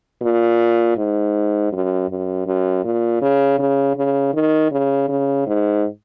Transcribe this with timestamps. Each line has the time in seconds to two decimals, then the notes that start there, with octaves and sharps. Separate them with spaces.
0.22 A#2
0.97 G#2
1.72 F#2
2.09 F#2
2.47 F#2
2.84 A#2
3.22 C#3
3.59 C#3
3.96 C#3
4.34 D#3
4.72 C#3
5.09 C#3
5.47 G#2